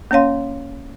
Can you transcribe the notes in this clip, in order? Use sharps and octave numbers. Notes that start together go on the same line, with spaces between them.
A#3 C#4 C#5 F5 C6